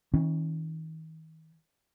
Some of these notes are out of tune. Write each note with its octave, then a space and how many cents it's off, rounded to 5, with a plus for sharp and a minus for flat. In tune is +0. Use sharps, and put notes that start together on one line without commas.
D#3 +40 C#4 -15